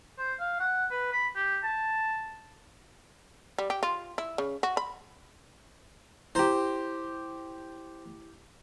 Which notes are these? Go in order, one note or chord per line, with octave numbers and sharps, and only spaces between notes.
C5
F5
F#5
B4
B5
G4
A5
G3
G4
F4
E4
C#3
F#4
B5
E4 G4 C5 A#5